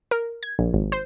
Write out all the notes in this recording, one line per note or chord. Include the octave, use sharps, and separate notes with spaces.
A#4
G#6
A#1
G#1
C5